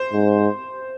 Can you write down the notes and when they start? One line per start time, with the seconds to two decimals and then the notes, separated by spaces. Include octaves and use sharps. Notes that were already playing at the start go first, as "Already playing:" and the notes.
Already playing: C5
0.13 G#2